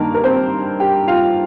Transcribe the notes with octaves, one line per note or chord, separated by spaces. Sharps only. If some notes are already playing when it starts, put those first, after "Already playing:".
Already playing: G2 D#3 A#3 D#4 A#4
A#4
C4 C5
G4 G5
F4 F5